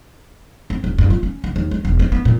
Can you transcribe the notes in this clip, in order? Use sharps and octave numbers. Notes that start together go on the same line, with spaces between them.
C4
D#1
G2
F4
C#4
C#2
D#2
G#3
E1
C4
B3
A#2